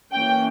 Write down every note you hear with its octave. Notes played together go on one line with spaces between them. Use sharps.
E3 A#3 C#4 G5